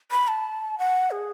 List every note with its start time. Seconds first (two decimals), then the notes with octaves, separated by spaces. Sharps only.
0.11 B5
0.28 A5
0.79 F#5
1.11 G#4